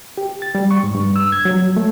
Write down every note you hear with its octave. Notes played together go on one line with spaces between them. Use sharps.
G4
A6
G3
C#6
G#2
G2
E6
G#6
F#3
F#3
A3